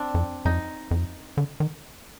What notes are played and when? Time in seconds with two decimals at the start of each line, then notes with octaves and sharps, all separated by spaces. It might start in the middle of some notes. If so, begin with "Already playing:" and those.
Already playing: C4 D4
0.14 F2
0.45 F2 D#4
0.91 F2
1.37 D3
1.60 D#3